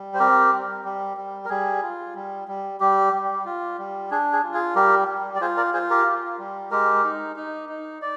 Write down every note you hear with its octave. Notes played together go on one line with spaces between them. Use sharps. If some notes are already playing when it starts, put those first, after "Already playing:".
Already playing: G3
C5
C4 G4 A#4
G3
G3
G3
A#4
G3 G#4
F4
G3
G3
G3 G4
G3
F4
G3
D4 G#4
G#4
F4
G#4
G3 G4 A#4
G3
D5
F4 G#4 C5
A#4 D5
F4 G#4 C5
G4 A#4
F4
G3
G#3 G4 A#4
D#4
D#4
D#4
D5